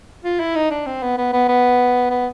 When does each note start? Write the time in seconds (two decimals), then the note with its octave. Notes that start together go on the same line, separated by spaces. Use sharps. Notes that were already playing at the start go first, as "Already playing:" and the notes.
0.24 F4
0.39 E4
0.55 D#4
0.70 D4
0.86 C4
1.02 B3
1.17 B3
1.33 B3
1.48 B3
2.10 B3